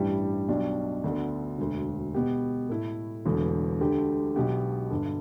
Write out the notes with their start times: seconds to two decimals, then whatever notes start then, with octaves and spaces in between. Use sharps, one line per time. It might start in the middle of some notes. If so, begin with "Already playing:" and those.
Already playing: A1 G2 G3 E4 G4
0.49 B1 B2 G3 D4
1.04 D2 D3 B3 D4 A4
1.58 E1 D2 D3
2.14 B2 B3 G4
2.69 A2 A3 E4
3.26 E1 E2 D3 A3
3.80 D2 D3 A3 G4
4.36 B1 B2 B3 G4
4.90 G1 G2 D3